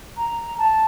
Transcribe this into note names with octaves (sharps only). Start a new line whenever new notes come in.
A#5
A5